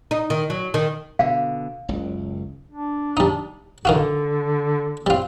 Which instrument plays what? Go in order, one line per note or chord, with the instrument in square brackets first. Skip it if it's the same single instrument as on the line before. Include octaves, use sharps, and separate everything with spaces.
[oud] D#4
D#3
F#3
D#3
[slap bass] B2 D3 [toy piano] F5
[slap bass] F#1 C#2
[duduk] D4
[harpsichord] G3 D#4
[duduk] D3 [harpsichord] D#3 F4 F#4
[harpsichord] G3 F4 [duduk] C4